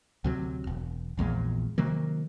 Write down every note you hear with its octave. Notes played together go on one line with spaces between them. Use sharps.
D2 C3 F#3
E1
A#1 E2 A#2 G#3
C3 D#3 F#3 A#3